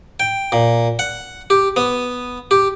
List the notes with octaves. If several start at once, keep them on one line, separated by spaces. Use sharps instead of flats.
G5
A#2
F#5
G4
B3
G4